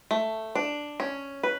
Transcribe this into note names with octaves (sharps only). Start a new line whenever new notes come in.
A3
D4
C#4
B4